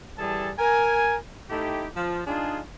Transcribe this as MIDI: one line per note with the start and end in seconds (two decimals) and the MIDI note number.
0.18 0.51 52
0.18 0.51 55
0.18 0.51 68
0.18 0.51 69
0.18 0.51 81
0.59 1.16 70
0.59 1.16 80
1.50 1.87 57
1.50 1.87 63
1.50 1.87 64
1.50 1.87 67
1.96 2.23 53
2.27 2.60 62
2.27 2.60 63
2.27 2.60 65
2.27 2.60 68